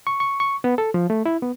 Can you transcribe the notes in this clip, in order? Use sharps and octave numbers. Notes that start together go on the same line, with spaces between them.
C#6
C#6
C#6
B3
A4
F3
A3
E4
B3